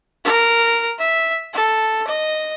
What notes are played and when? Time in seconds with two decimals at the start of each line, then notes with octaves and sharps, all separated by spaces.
0.24 A#4
0.98 E5
1.54 A4
2.07 D#5